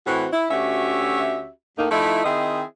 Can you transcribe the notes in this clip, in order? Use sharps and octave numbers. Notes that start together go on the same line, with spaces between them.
A2 E3 C4 F#4
E4
D2 C#4 F#4 G4 E5
A2 A#3 D#4
F3 A3 D#4 E4
D#3 C4 E4 G#4 D#5 E5